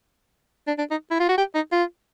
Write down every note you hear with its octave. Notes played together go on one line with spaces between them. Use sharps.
D4
D4
D#4
E4
F4
F#4
G4
D#4
F4